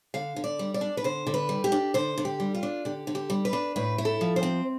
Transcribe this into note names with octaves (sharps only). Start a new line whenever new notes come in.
D3 F5
D3
D5
G3
D5
D4
B4
D3 C5
D3
B4
G3
G4
D4
D3 C5
D3
G4
G3
F4
D4
D3 G4
D3
G4
G3
B4
D4
A2 B4
E4
A4
F3
C5
C4